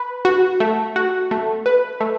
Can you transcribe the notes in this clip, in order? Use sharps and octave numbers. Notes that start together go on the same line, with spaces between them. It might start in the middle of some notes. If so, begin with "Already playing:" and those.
Already playing: B4
F#4
A3
F#4
A3
B4
A3